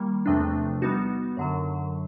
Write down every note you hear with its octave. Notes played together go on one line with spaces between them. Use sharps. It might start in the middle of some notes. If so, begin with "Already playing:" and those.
Already playing: D#3 G3 A#3
E2 C3 F3 A3 D4
G3 B3 D#4 F#4
F#2 D3 F#3